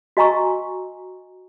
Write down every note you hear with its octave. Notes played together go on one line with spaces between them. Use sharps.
F#4 D#5 G#5 A#5 C#6 E6